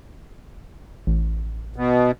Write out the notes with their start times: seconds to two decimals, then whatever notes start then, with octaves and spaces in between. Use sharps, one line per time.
1.07 A1
1.76 B2